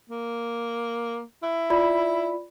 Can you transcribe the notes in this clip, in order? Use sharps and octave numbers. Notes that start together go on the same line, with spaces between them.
A#3
E4
F4 D5 B5